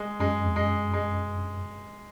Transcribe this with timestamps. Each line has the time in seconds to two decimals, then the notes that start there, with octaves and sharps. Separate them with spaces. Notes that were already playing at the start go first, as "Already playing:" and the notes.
Already playing: G#3
0.20 F#2 G#3
0.46 F2
0.56 F#2 G#3
0.93 G#3